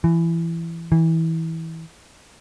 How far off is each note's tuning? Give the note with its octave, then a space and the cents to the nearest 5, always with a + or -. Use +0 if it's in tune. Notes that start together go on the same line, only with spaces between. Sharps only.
E3 +20
E3 -20